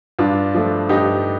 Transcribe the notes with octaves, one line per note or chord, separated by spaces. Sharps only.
G2 D4 F4
F3 A3
G2 D#4 G4